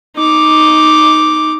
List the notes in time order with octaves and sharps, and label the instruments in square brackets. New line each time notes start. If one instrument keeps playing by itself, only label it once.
[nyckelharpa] D#4 D6